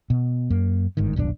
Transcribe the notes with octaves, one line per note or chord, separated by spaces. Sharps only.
B2
F#2 A#3
G1 G#2 D#3
D#1 B1 G2 D4